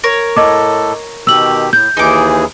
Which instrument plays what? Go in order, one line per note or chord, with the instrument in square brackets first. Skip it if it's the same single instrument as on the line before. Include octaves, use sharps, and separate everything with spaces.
[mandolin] A#4 C#5
[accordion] A2 A4 [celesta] D#5 D6
[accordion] B2 D#3 G4 [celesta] E6 F#7
[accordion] A2 [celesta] G6
[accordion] D#2 E3 G#4 [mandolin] D#4 D6